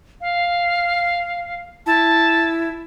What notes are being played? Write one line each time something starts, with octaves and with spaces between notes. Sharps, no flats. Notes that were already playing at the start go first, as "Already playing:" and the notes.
F5
E4 A5